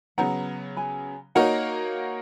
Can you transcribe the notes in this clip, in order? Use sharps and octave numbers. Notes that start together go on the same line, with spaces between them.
C#3 F#3 B3 F#5 A#5
G#5 B5
A#3 D#4 F#4 A#4 C#5 F#5 A#5